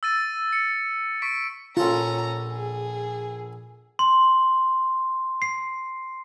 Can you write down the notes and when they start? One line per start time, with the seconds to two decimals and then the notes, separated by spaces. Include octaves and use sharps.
0.03 E6 A6 D#7
0.53 C#7
1.22 C#6 B6 D7
1.77 A#1 C#4 F4 A4 A5 A#5
2.52 G#4
3.99 C6
5.42 C7